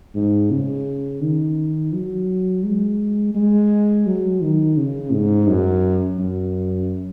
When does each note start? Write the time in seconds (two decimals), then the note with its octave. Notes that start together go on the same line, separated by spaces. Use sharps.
0.15 G#2
0.51 C#3
1.22 D#3
1.93 F#3
2.64 G#3
3.35 G#3
4.06 F#3
4.42 D#3
4.77 C#3
5.13 G#2
5.48 F#2
6.19 F#2